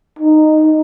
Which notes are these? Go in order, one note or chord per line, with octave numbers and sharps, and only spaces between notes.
D#4